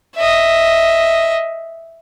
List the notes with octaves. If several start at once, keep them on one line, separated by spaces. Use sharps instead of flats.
D#5 E5